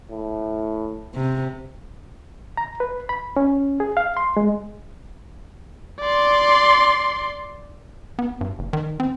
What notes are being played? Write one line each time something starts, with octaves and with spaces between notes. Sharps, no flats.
A2
C3
A#5
B4
B5
C#4
G#4
F5
C6
G#3
D5 C6
B3
G2
F#1
D#3
C4